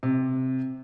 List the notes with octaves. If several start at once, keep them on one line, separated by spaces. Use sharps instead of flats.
C3